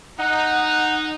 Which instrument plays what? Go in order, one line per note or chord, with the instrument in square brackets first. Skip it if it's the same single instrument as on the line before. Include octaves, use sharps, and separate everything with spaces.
[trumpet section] D#4 [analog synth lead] F#5